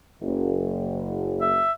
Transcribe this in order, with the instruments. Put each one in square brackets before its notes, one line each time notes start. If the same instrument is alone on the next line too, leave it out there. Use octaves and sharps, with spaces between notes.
[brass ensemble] F#1
[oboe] E5